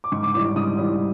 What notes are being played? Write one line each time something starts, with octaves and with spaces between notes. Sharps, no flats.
D6
G#2 C#6
D6
E3 G3 D6
D6
G#2 D#6
E3 G3